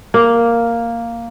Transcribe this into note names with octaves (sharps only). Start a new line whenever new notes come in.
A#3